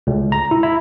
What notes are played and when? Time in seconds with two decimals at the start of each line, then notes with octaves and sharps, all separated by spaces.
0.07 C#2
0.32 A#5
0.51 E4
0.63 E4